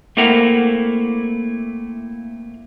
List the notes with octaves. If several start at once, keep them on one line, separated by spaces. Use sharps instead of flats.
A3 A#3 C4 E4 A#4 F#5